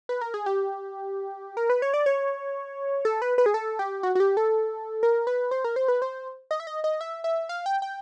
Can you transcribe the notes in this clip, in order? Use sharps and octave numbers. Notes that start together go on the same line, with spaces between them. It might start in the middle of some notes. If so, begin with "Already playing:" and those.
B4
A#4
G#4
G4
A#4
B4
C#5
D5
C#5
A4
B4
B4
G#4
A4
G4
F#4
F#4
G4
A4
A#4
B4
C5
A#4
C5
B4
C5
D#5
E5
D#5
D#5
E5
E5
F5
G5
G5